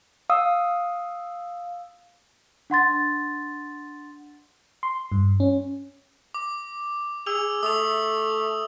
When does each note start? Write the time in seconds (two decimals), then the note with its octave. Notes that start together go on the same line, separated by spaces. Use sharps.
0.30 F5 D#6 E6
2.70 D4 F#5 C6 A6
4.83 C6
5.12 G2
5.40 C#4
6.34 D6
7.26 G#4 E6 F7
7.63 A3 D#6 F7